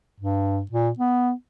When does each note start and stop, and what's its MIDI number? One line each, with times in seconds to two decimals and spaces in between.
0.20 0.62 43
0.71 0.89 46
0.99 1.31 59